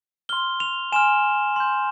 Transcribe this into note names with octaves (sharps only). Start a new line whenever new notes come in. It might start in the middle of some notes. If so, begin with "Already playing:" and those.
C6 F6 G7
F7
G#5 C6 F6 E7
C6 G6